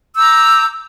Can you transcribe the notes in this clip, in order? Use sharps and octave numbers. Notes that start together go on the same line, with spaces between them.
A#5 D6 E6 G6